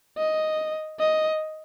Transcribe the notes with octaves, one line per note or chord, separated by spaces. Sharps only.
D#5
D#5